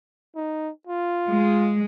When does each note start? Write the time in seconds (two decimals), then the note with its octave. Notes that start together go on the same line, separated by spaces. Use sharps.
0.36 D#4
0.87 F4
1.28 G#3